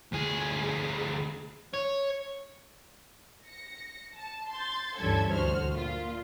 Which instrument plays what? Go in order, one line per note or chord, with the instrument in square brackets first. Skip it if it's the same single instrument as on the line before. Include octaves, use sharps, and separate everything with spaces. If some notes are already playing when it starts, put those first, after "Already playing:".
[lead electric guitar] D2 G#4
C#5
[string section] A#6 C#7
A5
C6 G6 A6
D2 G2 E3 C#4 A4 G#6
D2 F#4 C5 F6
A#2 F4